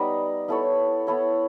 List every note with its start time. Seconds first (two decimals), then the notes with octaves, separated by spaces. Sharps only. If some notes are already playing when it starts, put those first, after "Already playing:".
Already playing: G3 B3 D#4
0.48 B3 E4 A4 C#5
1.07 B3 E4 A4 C#5